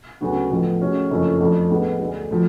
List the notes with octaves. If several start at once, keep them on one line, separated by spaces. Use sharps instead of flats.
D2 C#3 F#3 B3 F#4
A1 A2 F3 B3
A2 G#3 C#4 F#4
F#1 F2 F3 A3 C#4
F2 F3 A3 D4
A1 A2 G#3 B3
D2 D3 G#3
A2 F3